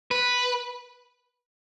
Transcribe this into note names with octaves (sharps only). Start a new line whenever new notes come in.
B4